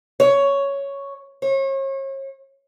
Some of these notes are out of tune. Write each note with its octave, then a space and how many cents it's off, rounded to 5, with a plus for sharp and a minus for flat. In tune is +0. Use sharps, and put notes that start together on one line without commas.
C#5 +5
C#5 -40